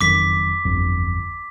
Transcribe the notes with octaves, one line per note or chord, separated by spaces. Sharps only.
F#1 F2 D#3 D6 B6
D1 G1 F2